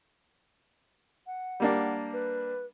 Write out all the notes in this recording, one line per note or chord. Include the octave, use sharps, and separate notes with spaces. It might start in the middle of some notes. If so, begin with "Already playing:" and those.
F#5
G3 A#3 D4
B4